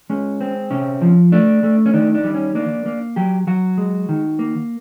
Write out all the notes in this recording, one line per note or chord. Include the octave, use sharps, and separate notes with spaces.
G#3 C#4
C4
C3 C#4
F3
A3 D4
A3
C#4
D#3 D4
D4
G3
C#4
A#3 D4
A#3
F#3 G4
F#3 F#4
G#3
D#3
A#3